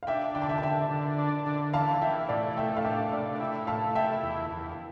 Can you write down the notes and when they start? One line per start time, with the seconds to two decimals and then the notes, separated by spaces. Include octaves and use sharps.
0.03 F5
0.07 D4 E5 G5
0.35 D3 G5
0.42 A5
0.49 E5 G5
0.58 A5
0.63 D3 E5 G5
0.91 D3
1.18 D4
1.46 D3
1.73 E3 F5 A5
2.02 E3 E5 G5
2.29 A2 D5 F5
2.57 A3 E5 G5
2.77 F5
2.85 D4 E5 G5
3.12 A2 D5 F5
3.40 E4 E5 G5
3.67 A3 F5 A5
3.95 E4 E5 G5
4.23 E2
4.51 E2